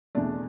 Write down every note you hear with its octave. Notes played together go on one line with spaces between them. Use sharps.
E2 B2 A3 D4 D5